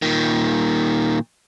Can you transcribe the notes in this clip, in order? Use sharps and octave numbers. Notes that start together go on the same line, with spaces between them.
A#2 D#3